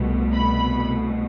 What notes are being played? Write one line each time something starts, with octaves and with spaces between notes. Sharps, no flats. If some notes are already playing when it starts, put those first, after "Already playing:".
Already playing: C2 B2 A3
B5